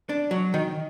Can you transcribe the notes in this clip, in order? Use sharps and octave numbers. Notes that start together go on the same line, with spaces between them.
D4
F#3
D#3